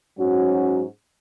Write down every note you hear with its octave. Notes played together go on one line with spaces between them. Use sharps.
G#2 F#3 C#4 F#4